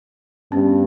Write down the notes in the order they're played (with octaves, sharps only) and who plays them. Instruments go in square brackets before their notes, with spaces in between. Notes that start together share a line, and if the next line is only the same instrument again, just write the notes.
[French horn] G2 [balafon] B3 C#4